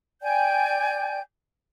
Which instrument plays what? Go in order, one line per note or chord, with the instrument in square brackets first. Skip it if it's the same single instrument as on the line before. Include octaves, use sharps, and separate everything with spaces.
[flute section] D5 G5 G#5 G6